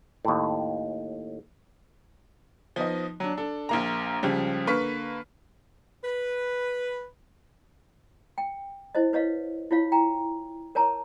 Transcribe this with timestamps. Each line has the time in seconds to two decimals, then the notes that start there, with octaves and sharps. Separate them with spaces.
0.25 D#2 A2
2.76 F3 B3 D#4 D#5
3.20 F#3 D4
3.37 D4 A4
3.69 A#1 A#3 A#5
4.23 C#2 C#3 F3 G3
4.67 D3 A#3 B4 C#6 F6 B6
6.04 B4
8.38 G5
8.95 E4 C5 D#5
9.13 B4 C#5 D#5 F5
9.71 E4 F4 C#5 F5
9.92 G5 A#5
10.75 A#4 C#5 A5 A#5